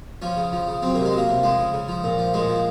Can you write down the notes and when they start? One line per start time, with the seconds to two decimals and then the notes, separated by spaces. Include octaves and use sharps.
0.22 F3 C#4
0.37 C#3
0.52 F3
0.67 C#3
0.82 F#3 C4
0.95 C3 A#3
1.05 G#3
1.12 F#3 A#3
1.28 C3
1.42 F3 G#3
1.58 C#3
1.73 C#3
1.88 F3
2.04 A#2
2.19 F3
2.34 A#2 G#3
2.49 F3